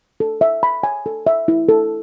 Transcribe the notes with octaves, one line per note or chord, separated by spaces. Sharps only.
A4
E5
B5
G#5
A4
E5
E4
A4